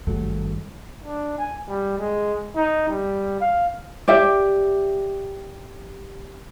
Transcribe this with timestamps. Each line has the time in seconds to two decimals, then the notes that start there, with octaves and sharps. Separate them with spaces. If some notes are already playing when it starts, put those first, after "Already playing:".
0.07 G#1 G2 F#3 A3
1.04 D4
1.38 G#5
1.68 G3
1.98 G#3
2.56 D#4
2.89 G3
3.40 F5
4.08 G4 D5 E5